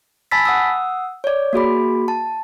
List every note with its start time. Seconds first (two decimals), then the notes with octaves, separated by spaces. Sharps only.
0.31 G#5 A5 B5 E6 A6 B6
0.45 F#5 D#6 E6
1.24 C#5 D5
1.53 A#3 F#4 G#4 B5
2.08 A5